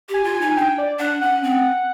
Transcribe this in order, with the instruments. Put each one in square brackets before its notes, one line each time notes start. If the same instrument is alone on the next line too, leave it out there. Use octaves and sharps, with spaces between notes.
[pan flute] G4
[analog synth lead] G#5
[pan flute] F4
[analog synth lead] G#5
[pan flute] D#4
[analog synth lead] G#5
[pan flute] D4 [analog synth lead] G5
[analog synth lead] D5
[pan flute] D4 [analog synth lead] F#5
[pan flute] C#4 [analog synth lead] F#5
[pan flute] C4